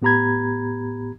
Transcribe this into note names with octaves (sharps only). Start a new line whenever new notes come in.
A2 B3 G4 A#5 B5 G#6